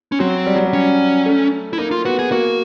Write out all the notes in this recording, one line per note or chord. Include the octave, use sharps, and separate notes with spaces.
C#4
F#3 C4
G3
F#3
G3
C#4
A3
E4
A#3 D#4
F4
B3 F#4
G#4
A#3 F#4